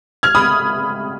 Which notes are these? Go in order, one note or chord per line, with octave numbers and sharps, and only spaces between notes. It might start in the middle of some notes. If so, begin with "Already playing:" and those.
F6 G#6
B5 D#6